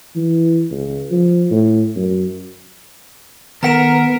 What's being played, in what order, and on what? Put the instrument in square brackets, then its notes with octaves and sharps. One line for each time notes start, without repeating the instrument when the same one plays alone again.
[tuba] E3
C#2
F3
A2
F#2
[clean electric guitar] D#3 A4 F#5 [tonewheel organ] B3 [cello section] A#4 [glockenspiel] A#5 B6 E7